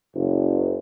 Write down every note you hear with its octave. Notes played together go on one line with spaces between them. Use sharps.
F#1